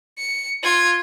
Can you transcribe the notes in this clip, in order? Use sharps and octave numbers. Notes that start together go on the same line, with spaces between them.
C#7
F4 G#6